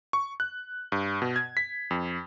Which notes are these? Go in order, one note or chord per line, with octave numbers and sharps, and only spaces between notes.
C#6
F#6
G2
B2
G#6
B6
F2